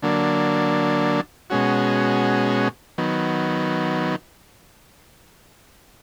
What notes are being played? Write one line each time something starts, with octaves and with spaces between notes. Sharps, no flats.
D3 F#3 A#3 D4
B2 G#3 C#4 F#4
D#3 F#3 B3